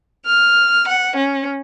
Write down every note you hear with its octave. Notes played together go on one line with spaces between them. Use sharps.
F6
F#5
C#4